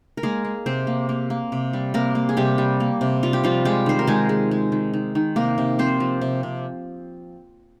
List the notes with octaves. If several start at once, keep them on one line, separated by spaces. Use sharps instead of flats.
A#4
G#3 A#3 G#4
A#3
C3 C4 C5
A#3
A#3
A#3
C3
G3
C3 A#3 A#4
A#3
G#4
C3 G3 G4
G3
A#3
C3
G3 F4
G4
F3 G3 F4
G3 G#3 G4
D#3 C5
A#4
D#3 G#3 G#4
G#3
G#3
D#3
D#3
D#3
C3 A#3 A#4
C3
F3 C4 C5
F3
C3
C3